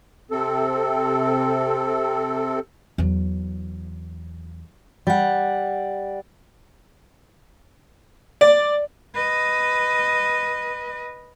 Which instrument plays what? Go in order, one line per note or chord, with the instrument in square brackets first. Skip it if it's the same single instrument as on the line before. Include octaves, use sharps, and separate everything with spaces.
[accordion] C3 C4 A4
[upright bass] E2 F#3
[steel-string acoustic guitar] G3 F#5
[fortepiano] D5
[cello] B4 D#5